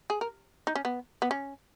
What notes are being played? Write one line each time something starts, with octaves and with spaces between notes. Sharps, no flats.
G#4
A#4
D#4
C#4
B3
B3
C#4